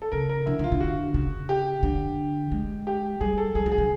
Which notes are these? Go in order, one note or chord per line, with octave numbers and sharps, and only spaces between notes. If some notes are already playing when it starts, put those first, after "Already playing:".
A4
C#3 A#4
A#4
D3 E4
D#3 F4
D3
F#4
C#3
G4
D3
G#3
G4
G3 G#4
A4
G3 G#4
F#3
G#4
D3